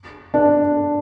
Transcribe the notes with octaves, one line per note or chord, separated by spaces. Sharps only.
D4